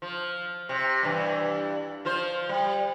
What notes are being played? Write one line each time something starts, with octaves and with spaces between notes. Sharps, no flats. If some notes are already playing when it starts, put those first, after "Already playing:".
F3
C3
G2 C3 E3
F3 F4 C5
G3